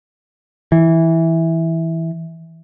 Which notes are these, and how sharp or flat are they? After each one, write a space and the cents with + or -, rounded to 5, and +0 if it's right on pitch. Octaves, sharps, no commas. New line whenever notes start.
E3 -10